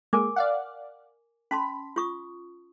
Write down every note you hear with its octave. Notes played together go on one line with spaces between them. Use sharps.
G#3 A#3 A#4 G#5 D6
D5 F5 F#5
C#4 A5 B5 C6
F4 C#6 D#6